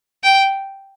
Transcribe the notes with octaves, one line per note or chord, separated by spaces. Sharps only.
G5